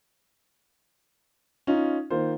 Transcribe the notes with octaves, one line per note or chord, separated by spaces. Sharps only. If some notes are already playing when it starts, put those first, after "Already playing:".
C#4 D#4 F4
D#3 A#3 F4 C5